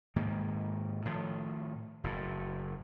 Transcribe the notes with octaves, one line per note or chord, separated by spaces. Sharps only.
G#2 D#3 A#3
A2 D#3 F3
F#1 A2